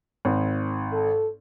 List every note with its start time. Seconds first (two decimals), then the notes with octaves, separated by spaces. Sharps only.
0.25 G#1
0.93 A4